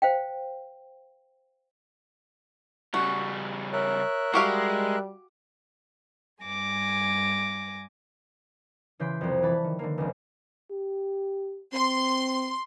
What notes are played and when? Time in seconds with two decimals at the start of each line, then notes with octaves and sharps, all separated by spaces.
0.02 C5 F5 G5
2.94 C#3 G3 F#4
3.73 A#4 C#5 E5 F#6
4.34 G3 G#3 F#4 G4 F5
6.42 G2 G#5 D6 A#6
9.00 C#3 E3 C6 G6 B6 D7
9.21 C2 F2
9.43 E3 A5 B5
9.64 D#3
9.79 D3 D#3 A#3
9.98 F1 C#2
10.71 G4
11.73 C4 C6